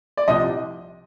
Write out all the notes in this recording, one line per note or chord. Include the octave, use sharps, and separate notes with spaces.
D5
C2 C3 F3 D#5